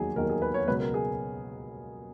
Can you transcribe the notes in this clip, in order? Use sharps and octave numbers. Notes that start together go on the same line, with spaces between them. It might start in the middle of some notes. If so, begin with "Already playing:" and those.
Already playing: E1 D#2 D#3 F#3 G#4
E1 D#2 D#3 F#3 A#4
G#4
B4
C#5
C#2 B2 F#3 B4
A#4
G#4